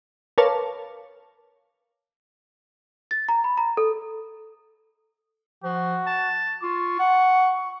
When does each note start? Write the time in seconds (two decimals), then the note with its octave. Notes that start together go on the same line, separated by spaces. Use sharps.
0.38 A#4 B4 C#5 F5 A5 D6
3.11 A6
3.29 A#5
3.44 B5
3.57 A#5
3.77 A4
5.64 F3 F#4
6.07 A5
6.63 F4 C#6
7.00 F#5